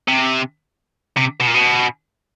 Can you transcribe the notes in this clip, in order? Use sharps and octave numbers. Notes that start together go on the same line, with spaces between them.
C3
C3
B2
A#2
B2